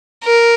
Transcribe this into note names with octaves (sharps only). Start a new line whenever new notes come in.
A#4